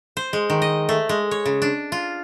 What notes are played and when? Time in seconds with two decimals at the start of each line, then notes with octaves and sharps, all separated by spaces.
0.17 C5
0.33 G#3
0.50 D#3
0.62 D#5
0.89 A3
1.09 G#3
1.31 C#5
1.45 C#3
1.62 D4
1.92 F4